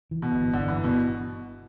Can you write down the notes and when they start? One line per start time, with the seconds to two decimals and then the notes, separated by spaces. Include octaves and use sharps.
0.11 E3
0.22 B2
0.32 G1
0.53 G1 D3
0.68 E3
0.74 G1
0.84 B2